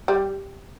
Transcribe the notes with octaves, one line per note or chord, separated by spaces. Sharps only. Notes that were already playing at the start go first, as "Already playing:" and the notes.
G3